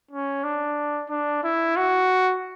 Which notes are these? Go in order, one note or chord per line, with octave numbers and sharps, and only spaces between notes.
C#4
D4
D4
E4
F#4